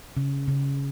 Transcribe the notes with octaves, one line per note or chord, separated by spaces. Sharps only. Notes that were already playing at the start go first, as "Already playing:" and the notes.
C#3
C#3